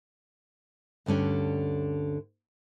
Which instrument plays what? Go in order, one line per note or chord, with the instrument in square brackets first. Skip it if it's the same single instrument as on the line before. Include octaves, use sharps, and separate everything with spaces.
[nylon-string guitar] D2 G2 D3 C#4 G4